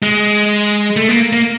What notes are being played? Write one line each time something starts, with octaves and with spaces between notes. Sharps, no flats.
G#3
A3
A#3
A#3